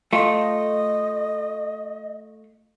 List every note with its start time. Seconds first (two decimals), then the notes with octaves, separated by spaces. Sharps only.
0.13 A3 F4 D#5